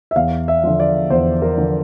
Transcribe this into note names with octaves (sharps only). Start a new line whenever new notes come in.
E5
E2 F5
E5
D3 F3
D5
E2 C5
A#4
D3 F3